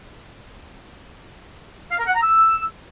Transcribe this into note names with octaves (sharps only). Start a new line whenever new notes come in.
F5
A#4
F#5
A#5
E6